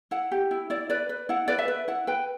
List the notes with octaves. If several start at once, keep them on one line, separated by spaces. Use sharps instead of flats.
E4 F#5
G4
E4
E4 D5
B4 D5
B4
E4 F#5
B4 D5
E5
B4
E4 F#5
B4 G5